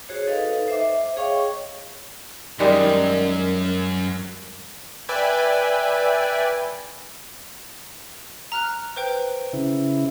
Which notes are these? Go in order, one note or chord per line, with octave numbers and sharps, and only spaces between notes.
F#4 G#4 C5 C#5
D#4 A4 B4 D#5 F5
C5 E5 D6
G#4 C#5 D#5 F5 G5 C#6
F#2 D#3 G3 G#3
B4 D5 E5 G5 G#5
A#5 F6 F#6
B4 C5 G5
C#3 E4